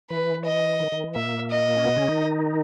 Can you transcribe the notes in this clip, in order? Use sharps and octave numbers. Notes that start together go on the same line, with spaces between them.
E3 B4
D#5
D#3
D#3
E3
A#2 A#3 E5
D#5
C#4
B2 B3
C#3 C#4
D#3 D#4